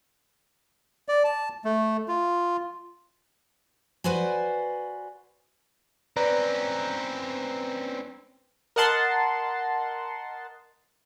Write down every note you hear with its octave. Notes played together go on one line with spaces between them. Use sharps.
D5
A5
A3
F4
F#4 B4 C5 D5 G#5
C4 C#4 B4 D5 A#5
A#4 D#5 F#5 A5 C6